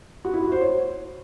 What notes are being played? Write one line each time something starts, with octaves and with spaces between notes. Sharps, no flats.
F#4
E4
F#4
C5
C#5